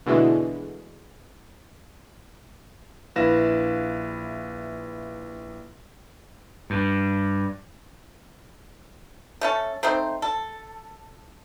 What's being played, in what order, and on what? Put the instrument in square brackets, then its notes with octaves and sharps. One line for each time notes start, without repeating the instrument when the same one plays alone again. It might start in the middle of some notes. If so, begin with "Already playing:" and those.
[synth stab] B2 D3 E3 G#3 A3
[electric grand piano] A#1 E4 B4 F5 A#6 E7
[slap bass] G2
[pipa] A3 C#4 A4
A3 C4 D#4 C5
A4